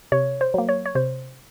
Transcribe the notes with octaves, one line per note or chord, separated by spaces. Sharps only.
C3 C#5
C5
F#3 A#3
C#5
C#5
C3 C5